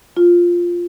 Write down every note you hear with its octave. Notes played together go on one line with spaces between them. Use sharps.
F4